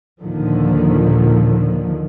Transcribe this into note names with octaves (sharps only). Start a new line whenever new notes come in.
D#2 A#2 D3 D#3 F3